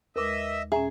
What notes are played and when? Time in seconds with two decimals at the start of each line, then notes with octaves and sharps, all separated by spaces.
0.16 D#2 G#3 A#4 B4 D#5 E5 D6
0.72 A#2 C#4 G#4 E5 A#5